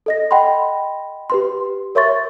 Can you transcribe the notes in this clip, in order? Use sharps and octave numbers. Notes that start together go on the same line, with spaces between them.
A4 D#5 A#6
D#5 F#5 G5 B5 C6
G4 B4 C6
A#4 C#5 E5 C6 C#6 A6